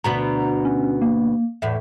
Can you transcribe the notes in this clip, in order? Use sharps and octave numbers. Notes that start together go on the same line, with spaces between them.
D2 B2 B3 A#5
C#4
A#3
E2 A2 E5